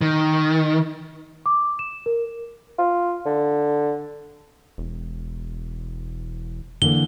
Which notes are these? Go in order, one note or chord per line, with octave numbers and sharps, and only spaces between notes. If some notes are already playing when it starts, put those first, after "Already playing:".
D#3
D6
E7
A#4
F4
D3
E1
D3 E3 A#3 G7